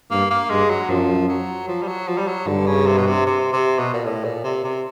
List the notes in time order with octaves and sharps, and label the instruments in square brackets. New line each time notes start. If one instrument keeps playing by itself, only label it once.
[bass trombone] G2 [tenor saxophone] A#3
[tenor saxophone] A#3
[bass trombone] G2 [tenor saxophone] G#3
[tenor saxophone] F#3
[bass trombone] F#2 [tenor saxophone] F3
[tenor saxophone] F#3
F3
G3
F#3
F3
G3
F#3
[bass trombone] G2 [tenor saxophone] D3
[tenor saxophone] C#3
C3
B2
C3
C3
C3
B2
A#2
A2
A#2
C3
C3